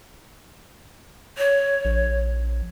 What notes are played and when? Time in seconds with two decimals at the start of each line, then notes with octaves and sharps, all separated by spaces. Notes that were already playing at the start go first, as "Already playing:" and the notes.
1.38 C#5
1.85 A#1